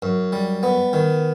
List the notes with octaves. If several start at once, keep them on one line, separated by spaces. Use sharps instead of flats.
F#2
G3
B3
D#3